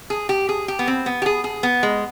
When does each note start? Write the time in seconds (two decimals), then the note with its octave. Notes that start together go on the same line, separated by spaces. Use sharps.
0.10 G#4
0.29 G4
0.49 G#4
0.68 G4
0.79 B3
0.88 C4
1.06 B3
1.22 G4
1.26 G#4
1.44 G#4
1.63 B3
1.83 G#3